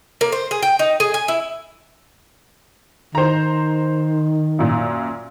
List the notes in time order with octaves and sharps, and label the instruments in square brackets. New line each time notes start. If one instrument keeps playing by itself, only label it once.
[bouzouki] A#3
C5
G#4
G5
D#4
G#4
G#5
E4
[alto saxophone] D#3 [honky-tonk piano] C5 A#5
[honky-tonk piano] F#2 A#2